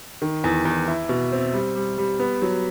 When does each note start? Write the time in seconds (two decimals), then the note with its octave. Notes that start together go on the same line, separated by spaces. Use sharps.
0.22 D#3
0.44 E2
0.65 E2
0.88 E4
1.09 B2
1.32 C4
1.54 G3
1.75 G3
1.98 G3
2.20 B3
2.42 F#3